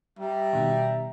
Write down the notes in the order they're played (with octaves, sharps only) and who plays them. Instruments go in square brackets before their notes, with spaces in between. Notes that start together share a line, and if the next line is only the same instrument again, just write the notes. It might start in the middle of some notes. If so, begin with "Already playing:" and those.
[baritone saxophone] G3 [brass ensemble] E5 A#5
[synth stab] B2 D#3